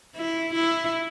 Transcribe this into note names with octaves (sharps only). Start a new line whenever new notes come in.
E4
E4